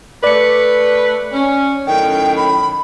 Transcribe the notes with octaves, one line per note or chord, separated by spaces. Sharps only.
A3 B4 D5 C#7
C#4
F#2 A2 D#3 G5
B5